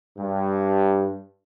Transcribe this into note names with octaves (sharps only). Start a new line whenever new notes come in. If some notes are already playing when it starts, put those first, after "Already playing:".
G2